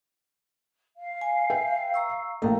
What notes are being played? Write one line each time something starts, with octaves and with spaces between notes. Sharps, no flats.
F5
G#5
B4 E5 G5
A#5 C#6 E6
A#1 A3 A#4 F5 A#5